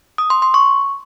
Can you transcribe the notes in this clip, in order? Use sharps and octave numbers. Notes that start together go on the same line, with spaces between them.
D#6
C6
C6
C#6